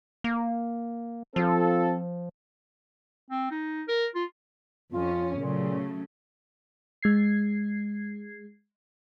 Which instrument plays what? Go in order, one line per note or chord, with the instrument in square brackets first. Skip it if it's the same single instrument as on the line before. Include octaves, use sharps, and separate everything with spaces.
[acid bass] A#3
[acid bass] F3 [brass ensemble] C4 F4 A4
[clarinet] C4
D#4
A#4
F4
[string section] F2 C#4 [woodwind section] F4
[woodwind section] A#2 [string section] C#3 F#3 A3
[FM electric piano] G#3 G#6 C7